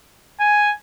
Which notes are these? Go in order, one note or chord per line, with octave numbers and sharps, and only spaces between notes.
G#5